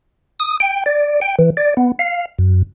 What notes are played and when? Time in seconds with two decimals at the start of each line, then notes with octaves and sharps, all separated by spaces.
0.40 D#6
0.60 G5
0.86 D5
1.21 G5
1.39 E3
1.57 D5
1.77 B3
1.99 F5
2.39 F#2